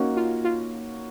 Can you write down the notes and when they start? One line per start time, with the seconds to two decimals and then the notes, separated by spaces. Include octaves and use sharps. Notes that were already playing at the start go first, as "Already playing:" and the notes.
Already playing: A#3 C#4 D#4 F#4 C#5
0.17 F4
0.44 F4